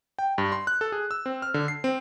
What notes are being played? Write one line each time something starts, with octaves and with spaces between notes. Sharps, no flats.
G5
G2
C6
F#6
A4
G#4
E6
C4
F6
D3
C7
C4